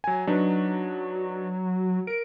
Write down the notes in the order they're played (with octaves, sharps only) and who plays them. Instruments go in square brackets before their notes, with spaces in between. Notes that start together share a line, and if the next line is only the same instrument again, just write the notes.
[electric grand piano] F#3 G#5
[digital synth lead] F#3 [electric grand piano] D4 D#4 B4
[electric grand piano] A#4 [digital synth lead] D7